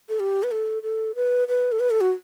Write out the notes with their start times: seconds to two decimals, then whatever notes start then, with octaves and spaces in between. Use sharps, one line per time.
0.09 A4
0.20 G4
0.43 B4
0.51 A4
0.83 A4
1.16 B4
1.48 B4
1.72 A4
1.80 B4
1.91 A4
2.01 F#4